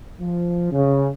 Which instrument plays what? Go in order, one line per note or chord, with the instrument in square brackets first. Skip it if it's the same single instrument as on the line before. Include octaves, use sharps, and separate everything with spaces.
[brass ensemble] F3
C#3